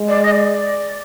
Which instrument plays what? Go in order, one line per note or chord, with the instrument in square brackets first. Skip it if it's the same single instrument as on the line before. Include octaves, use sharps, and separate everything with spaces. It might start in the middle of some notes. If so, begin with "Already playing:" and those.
Already playing: [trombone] G#3
[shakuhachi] D5
D#5
D5